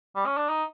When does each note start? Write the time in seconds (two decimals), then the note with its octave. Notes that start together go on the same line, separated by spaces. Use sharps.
0.16 G3
0.26 C#4
0.37 D4
0.49 D#4